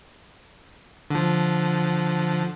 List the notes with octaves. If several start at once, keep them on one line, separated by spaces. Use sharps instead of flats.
D3 F3